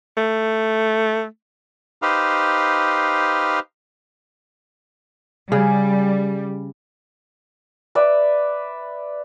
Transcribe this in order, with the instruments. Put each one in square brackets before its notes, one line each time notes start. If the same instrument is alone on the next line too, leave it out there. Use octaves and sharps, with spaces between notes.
[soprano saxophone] A3
[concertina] D#4 G4 B4 C5 F5
[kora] C#3 G#4 [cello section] G3
[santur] B4 D5 E5